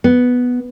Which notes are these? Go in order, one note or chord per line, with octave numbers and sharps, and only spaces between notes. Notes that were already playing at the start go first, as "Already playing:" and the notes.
B3